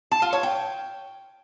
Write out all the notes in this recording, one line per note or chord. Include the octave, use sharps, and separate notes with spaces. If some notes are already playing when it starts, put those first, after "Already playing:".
A5
F4
C#5
G5